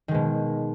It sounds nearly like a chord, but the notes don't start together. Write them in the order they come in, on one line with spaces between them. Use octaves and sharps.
D#3 G#3 B2